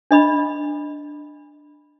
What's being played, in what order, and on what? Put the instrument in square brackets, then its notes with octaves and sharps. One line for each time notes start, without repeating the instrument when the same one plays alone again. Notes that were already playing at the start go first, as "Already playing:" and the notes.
[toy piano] D4 D#5 B5